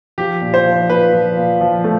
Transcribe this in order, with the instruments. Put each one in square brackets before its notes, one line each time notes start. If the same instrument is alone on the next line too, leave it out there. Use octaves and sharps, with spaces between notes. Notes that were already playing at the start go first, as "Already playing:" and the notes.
[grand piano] F3 [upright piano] G4
[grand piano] A#2
[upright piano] C5
[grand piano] F3
[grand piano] A#2 [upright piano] B4
[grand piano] F3
A#2
F3
A3